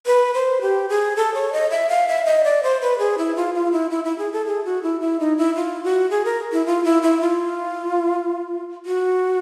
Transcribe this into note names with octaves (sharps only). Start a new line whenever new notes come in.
B4
C5
G4
G#4
A4
C#5
D#5
E5
F5
E5
D#5
D5
C5
B4
G#4
E4
F4
F4
E4
E4
E4
G#4
A4
G#4
F#4
E4
E4
D#4
E4
F4
F#4
G#4
A#4
E4
F4
E4
E4
F4
F#4